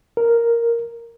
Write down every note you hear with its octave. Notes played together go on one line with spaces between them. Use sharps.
A#4